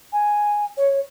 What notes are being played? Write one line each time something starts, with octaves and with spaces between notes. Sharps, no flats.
G#5
C#5